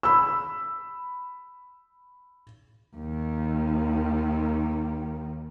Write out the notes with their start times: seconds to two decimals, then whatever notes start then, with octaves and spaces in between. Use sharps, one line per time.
0.03 B5 E6
2.97 D#2 D#3